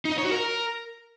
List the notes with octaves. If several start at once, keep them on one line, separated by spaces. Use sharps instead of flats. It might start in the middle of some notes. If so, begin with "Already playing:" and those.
D#4
D#5
C#5
F#4
A#4